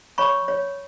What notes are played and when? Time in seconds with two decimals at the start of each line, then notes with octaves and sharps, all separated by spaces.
0.18 C#5 B5 C#6
0.48 C#5